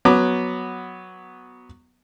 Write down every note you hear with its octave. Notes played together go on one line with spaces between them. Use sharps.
F#3 B3 D6